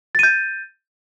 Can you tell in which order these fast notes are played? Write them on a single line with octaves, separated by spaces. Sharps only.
A6 D#7 G6